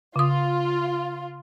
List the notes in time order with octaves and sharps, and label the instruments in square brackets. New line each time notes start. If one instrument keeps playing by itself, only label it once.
[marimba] C#3 D#6 [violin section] F4